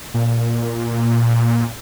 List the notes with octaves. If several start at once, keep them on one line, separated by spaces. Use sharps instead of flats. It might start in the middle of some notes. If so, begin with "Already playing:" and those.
A#2